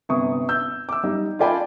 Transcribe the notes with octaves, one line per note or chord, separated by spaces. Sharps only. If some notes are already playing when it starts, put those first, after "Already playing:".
G1 C3 C#6 D#6
E6 G6
D6 E6
G3 D#4
F4 A4 D5 G5 G#5 B5